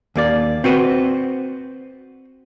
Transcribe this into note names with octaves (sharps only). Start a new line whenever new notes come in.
D#2 A#3 D5
C4 F#4 B4 C5